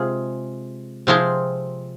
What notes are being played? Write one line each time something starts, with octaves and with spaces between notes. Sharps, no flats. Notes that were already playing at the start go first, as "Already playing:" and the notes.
Already playing: C3 G#3 F4 G#4
C3 F3 C4 F4 G#4